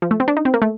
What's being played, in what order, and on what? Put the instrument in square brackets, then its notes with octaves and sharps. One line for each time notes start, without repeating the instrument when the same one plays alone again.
[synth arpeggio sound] F3
A3
C4
D4
D#4
C4
A#3
A3